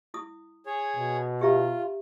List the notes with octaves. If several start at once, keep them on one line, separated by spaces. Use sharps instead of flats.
E4 D#6
G#4 C#5
B2
F4 G4 E5 A#5